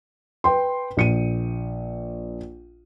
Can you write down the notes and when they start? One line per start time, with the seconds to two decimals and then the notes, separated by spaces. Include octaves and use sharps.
0.44 B4 G5 C6
0.97 A#1 C#7 D#7